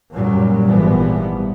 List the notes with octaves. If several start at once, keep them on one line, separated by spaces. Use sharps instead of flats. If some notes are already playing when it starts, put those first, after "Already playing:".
F#2 A#2 F#3 G3
G#1 A#2 E3 F3 G3 B3